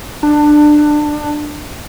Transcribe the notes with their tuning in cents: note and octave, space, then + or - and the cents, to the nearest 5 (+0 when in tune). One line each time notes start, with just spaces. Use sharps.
D4 +20